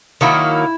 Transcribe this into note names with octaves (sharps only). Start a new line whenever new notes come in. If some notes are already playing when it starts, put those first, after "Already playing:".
D#3 F#3 A#3 E4